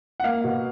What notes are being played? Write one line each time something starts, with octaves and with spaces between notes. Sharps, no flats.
F#5
A#3 F5
B2